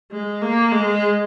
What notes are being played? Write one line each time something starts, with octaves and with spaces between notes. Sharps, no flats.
G#3
A#3
G#3